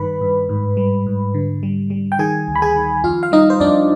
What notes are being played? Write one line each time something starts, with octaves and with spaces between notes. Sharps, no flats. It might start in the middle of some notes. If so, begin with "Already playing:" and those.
Already playing: G2 D#3 B4 B5
G2
G#2
G3
G#2
D3
G3
G3
G5
D#3 G#4 G#5
D2
B5
G#4 G#5
D#3
F2 F4 F5
F5
G3 D#4 D#5
C5
F2 D4 D5